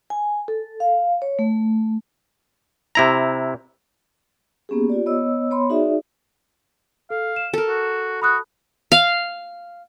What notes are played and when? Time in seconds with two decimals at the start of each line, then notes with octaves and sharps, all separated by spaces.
0.10 G#5
0.48 A4
0.80 F5
1.22 C#5
1.39 A3
2.95 C3 E4 A#5
4.69 A#3 B3 C#4 G4 G#4
4.89 F4 G4 D5
5.06 B3 C#5 D#5 E6
5.51 B3 C#5 B5 C6
5.70 D#4 F#4 G#4 D5 E5
7.10 A4 F5
7.36 E7
7.53 A4 A#4
7.68 F#4
8.22 F#4 B5 D#6 F#6
8.92 F5